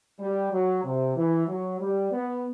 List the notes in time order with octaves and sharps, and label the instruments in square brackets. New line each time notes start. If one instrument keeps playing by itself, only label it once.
[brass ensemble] G3
F#3
C3
E3
F#3
G3
B3